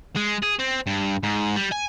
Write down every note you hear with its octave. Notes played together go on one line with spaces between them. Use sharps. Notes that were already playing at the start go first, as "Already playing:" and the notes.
G#3
G#4
C4
G2
G#2
G3
G#5